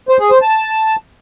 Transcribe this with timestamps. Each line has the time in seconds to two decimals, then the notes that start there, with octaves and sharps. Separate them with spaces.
0.09 C5
0.20 G#4
0.31 C5
0.42 A5